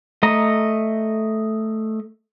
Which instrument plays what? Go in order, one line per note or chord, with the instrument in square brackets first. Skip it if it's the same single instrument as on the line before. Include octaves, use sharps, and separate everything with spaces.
[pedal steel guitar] A3 D#5 A#5